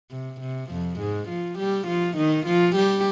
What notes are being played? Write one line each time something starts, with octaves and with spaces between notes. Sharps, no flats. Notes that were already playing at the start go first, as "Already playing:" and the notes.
C3
C3
F2 F3
G#2 G#3
F3 F4
G3 G4
F3 F4
D#3 D#4
F3 F4
G3 G4